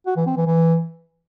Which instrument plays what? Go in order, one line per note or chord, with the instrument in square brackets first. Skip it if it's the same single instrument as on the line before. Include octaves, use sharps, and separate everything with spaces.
[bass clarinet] F#4
E3
C4
E3
E3